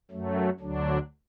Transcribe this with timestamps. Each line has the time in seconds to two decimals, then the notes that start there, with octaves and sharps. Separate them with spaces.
0.11 F#2 F#3 A3
0.60 D2 D3 F#3 D4